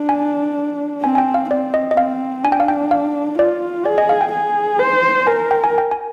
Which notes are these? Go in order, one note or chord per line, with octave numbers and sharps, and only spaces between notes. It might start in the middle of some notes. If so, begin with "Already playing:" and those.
Already playing: D4
G#5
C4 G#5
G#5
G5
F5
C4 D5
D#5
D#5
C4 F5
D4 G#5
G5
F5
G5
F5
F4 D5
G#4 D5
D#5
F5
G5
G#4
C5
A#4 G#5
G5
G#5
G5
G#5